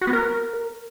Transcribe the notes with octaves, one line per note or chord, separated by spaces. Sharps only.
F#4
B3
A#4